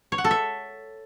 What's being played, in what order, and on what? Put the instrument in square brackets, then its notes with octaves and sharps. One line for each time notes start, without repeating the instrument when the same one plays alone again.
[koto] C#5
F#5
A4
E5